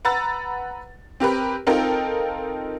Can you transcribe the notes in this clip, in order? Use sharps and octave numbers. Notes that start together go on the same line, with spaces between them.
B4 F#5 A#5 E6 A6
C4 G4 A#4 B4
C4 D#4 F4 A4 A#4 G5